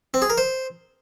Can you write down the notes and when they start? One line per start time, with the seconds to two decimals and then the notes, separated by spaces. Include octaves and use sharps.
0.14 C4
0.22 G#4
0.30 A#4
0.38 C5